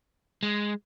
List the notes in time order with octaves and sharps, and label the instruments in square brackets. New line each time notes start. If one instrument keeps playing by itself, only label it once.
[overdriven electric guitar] G#3